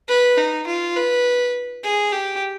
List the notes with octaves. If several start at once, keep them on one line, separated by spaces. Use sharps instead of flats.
B4
D#4
F4
B4
G#4
G4